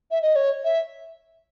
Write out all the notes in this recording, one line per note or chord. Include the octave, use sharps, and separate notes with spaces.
E5
D#5
C#5
E5